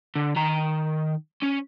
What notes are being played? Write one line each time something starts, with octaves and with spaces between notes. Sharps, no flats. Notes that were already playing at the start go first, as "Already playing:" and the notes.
D3
D#3 A#5
C#4